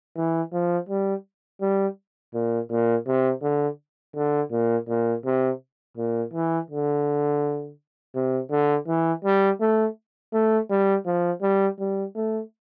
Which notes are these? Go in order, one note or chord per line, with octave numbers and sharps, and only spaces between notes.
E3
F3
G3
G3
A#2
A#2
C3
D3
D3
A#2
A#2
C3
A#2
E3
D3
C3
D3
E3
G3
A3
A3
G3
F3
G3
G3
A3